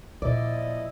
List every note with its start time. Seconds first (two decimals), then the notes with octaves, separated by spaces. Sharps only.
0.22 A#2 F3 E4 D5 D#5